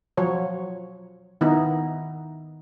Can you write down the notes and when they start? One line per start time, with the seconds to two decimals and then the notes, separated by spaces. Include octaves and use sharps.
0.17 F3 F#3 C#5
1.41 D#3 B3 D#4 E4